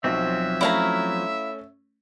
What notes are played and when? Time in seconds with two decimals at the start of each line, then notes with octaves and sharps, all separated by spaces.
0.04 B1 F3 F#3 C4 E5
0.61 A3 C#4 E4 F5 A#5